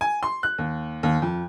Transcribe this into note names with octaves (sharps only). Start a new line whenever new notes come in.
G#5
C6
F#6
D#2
D#2
F2